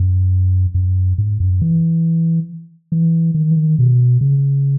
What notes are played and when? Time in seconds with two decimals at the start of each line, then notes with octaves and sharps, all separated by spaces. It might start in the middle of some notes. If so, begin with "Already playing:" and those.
Already playing: F#2
0.74 F#2
1.18 G#2
1.40 F#2
1.62 E3
2.92 E3
3.34 D#3
3.51 E3
3.56 D#3
3.78 B2
4.21 C#3